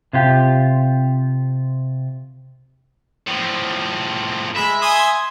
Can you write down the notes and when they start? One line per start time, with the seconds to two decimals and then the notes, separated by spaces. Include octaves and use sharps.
0.13 C3 F4 G4
3.27 A2 F3
4.56 G#3 E5 B5
4.82 G#5 C6 D#6